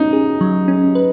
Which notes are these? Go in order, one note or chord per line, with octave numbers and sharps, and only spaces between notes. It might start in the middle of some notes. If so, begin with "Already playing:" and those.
Already playing: C#4 D#4
G#4
F#3
C#4
B4